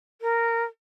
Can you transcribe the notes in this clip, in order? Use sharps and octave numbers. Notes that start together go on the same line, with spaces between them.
A#4